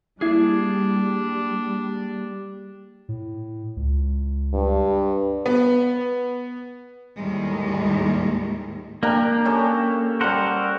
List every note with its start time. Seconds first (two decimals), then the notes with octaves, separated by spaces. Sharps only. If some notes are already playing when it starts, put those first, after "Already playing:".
0.21 G3 A#3 D4 E4 G#4 G#6 C7
3.08 A2
3.76 C#2
4.53 G2
5.46 B3
7.16 D#2 A2 D#3 G3 G#3
9.03 A#3 D4 G4 A#4
9.45 C#4 G4 A4
10.21 G3 A4 A#4 C5 F#5